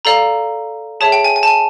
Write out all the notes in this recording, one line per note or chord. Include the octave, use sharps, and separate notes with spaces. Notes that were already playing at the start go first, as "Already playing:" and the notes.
A4 D5 F5 A#5
G#4 C#5 E5 A5
G5
G#5
G#5
A5
G#5